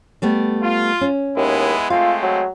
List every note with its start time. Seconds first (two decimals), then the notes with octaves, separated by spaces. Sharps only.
0.22 G3 A3 B3
0.62 F4
1.01 C#4
1.36 D#2 G#3 B3 E4
1.90 G#3 A3 C4 F4 F5
2.23 F#3